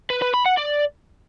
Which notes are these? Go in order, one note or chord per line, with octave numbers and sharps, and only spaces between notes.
B4
B4
B5
F#5
D5